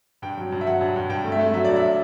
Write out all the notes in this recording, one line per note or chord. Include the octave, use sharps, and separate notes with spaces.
G2 G5
F#3
G2
E5
F#3 F#5
G2
G2
G2 G5
A3
E5
A3
F#3 E5
G2 D5
E5